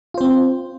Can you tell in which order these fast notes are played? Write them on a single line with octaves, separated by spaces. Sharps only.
F4 C5 C4